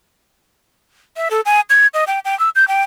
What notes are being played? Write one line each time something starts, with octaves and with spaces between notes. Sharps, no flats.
E5
A4
G#5
G#6
D#5
G5
G5
E6
G6
G5